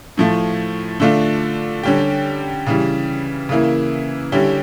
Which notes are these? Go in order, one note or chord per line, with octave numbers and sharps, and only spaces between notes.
A2 F3 A3
D3 A3 D4 F4
D3 G3 C#4 G4
C#3 E3 G3
C#3 E3 A#3 E4
D3 G3 C#4 E4 G4